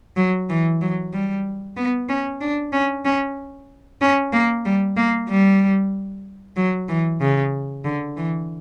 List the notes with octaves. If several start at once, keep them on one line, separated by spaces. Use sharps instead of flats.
F#3
E3
F#3
G3
B3
C#4
D4
C#4
C#4
C#4
A#3
G3
A#3
G3
F#3
E3
C#3
D3
E3